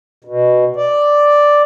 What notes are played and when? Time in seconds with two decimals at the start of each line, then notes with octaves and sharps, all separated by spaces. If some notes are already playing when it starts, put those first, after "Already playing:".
0.24 B2
0.76 D5